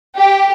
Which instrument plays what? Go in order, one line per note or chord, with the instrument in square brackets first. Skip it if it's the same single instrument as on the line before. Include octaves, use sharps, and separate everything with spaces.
[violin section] G4